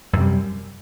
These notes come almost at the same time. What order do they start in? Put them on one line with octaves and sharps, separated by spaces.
F#2 C3 G3